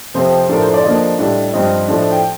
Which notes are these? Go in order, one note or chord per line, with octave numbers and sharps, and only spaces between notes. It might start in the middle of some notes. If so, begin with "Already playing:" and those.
F2 C3 F3 C4 C5
A2 F3 A3 D4 A#4
C5
D5
D3 F3 A#3 D4 D#5
A2 G3 D4
G2 F3 C4 D#5
A2 F3 A3 D4
G5